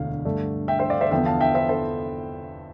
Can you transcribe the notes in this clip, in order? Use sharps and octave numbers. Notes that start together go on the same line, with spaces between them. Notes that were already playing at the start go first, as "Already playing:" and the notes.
Already playing: E1 D2 D3 F5
G2 D3 A3 D4
E5 G5
C5 E5
D5 F5
C5 E5
E2 D3 F3 B3 E5 G5
F5 A5
E5 G5
C5 E5
A4 C5